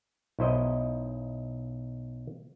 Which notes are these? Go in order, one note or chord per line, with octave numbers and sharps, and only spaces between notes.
B1 E4 C5 D#5